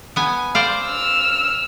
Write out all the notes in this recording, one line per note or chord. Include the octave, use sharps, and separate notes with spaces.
B3 G#5
C5 D5 F5
E6 F6